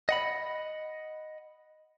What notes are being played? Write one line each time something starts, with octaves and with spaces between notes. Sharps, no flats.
D#5 F#5 B5